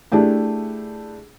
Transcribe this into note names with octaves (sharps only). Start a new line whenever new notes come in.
A3 D4 E4 G4 G#4